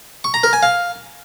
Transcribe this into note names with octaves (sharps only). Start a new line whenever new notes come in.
C#6
A#5
A#4
G#5
F5